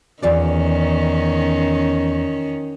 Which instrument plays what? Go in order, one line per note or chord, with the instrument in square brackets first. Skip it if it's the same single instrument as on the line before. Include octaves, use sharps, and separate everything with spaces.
[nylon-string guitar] E2 F4 D5 [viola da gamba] D#3 C#4